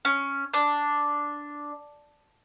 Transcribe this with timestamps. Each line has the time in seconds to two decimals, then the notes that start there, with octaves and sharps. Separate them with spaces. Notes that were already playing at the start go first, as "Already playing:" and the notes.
0.05 C#4
0.53 D4